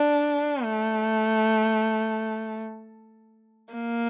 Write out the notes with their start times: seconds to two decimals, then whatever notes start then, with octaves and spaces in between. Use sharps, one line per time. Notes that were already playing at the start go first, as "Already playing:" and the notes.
Already playing: D4
0.64 A3
3.74 A#3